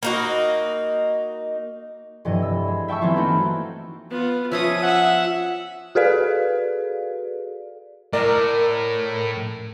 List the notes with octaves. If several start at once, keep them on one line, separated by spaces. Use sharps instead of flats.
A#3 D#4 F#4
F1 G2 E3 D#5
E6
G#3
E5 G5 A5 C#6 E6
E3 F#3 B3 C4 F4
A3 A#3 D#4 F#4
B3 F4
F3 C#4 F4 C#5 E5 D#6
E5 F#5
F#4 G#4 A4 B4 D5 F5
A2 A#4 D5